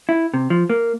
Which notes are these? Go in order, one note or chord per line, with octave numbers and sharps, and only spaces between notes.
E4
C3
F3
A#3